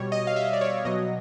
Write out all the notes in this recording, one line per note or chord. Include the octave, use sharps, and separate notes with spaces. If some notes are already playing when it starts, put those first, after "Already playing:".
Already playing: B2 G3 C#5
D#5
F5
E5
D#5
D5
C#5
B2 F#3 D#5